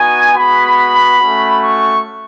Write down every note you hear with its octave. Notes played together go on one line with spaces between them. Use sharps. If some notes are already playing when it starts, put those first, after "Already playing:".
Already playing: B3 D#4 F#4 G#5
G#3 B3 F#4 B5
A3 C#4 F#4
C#6